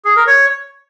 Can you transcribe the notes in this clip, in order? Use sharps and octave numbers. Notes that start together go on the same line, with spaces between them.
G#4
A#4
C#5